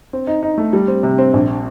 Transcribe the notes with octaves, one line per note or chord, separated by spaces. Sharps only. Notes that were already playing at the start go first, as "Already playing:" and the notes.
C4
D#4
D#4
A3
G3
C4
C3
C4
A#1